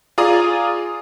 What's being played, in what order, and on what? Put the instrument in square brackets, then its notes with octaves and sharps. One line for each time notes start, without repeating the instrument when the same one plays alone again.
[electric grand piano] F4 G#4 D5 A#5 D#6